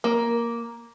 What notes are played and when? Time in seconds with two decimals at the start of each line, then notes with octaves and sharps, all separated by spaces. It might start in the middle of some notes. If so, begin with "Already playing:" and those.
0.04 A#3